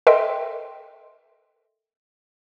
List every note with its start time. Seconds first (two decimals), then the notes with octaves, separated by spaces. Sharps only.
0.07 A4 A#4 D#5 E5 G5 C6